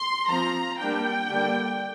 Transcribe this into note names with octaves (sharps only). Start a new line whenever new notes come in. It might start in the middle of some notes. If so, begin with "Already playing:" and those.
Already playing: C6
F3 C4 A#5
G3 A#3 D4 G5
D3 G3 A#3 D4